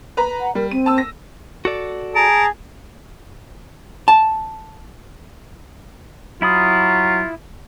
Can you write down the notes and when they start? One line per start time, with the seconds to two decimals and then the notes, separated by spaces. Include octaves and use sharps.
0.17 B4 A#5
0.40 F#5
0.55 G3 A#4
0.71 C4 D#7
0.86 A5 E6
0.98 A#6
1.65 F#4 A4 D5
2.15 G#4 A5 A#5 D7
4.08 A5
6.42 F#3 E4 F4 B5 D#6